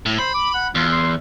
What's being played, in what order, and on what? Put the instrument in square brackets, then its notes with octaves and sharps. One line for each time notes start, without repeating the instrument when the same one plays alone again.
[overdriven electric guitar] A2
[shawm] C5 [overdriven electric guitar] B5
[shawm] D6
F#5
[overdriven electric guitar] E2 [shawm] F4
[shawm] C6